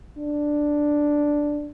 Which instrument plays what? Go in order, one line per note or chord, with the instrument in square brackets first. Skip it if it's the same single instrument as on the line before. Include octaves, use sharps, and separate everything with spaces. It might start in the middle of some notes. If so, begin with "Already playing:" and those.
[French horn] D4